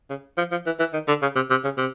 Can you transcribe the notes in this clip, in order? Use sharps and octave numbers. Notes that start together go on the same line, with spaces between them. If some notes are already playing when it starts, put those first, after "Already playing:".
C#3
F3
F3
E3
E3
D#3
D3
C#3
C3
C3
C#3
C3